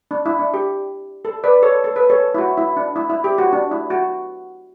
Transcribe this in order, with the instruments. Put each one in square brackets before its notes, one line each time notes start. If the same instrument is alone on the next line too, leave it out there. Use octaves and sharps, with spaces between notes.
[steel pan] D4
E4
D4
G4
A4
B4 D5
A4 C#5
A4
B4
A4 C#5
E4
F#4
E4
D4
E4
E4
G4
F#4
D4
E4
F#4